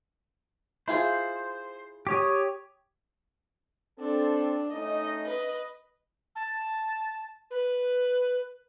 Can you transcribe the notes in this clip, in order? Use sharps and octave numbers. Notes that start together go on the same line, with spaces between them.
E4 F4 G#4 C5
G4 C#5 D#6
C4 D4 A4
A3 C#4 D#4 D#5
B4 D#5
A5
B4